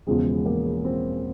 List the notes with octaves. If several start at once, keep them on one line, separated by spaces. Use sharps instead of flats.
E1 E2 C#3 F3 G#3
A#3
C4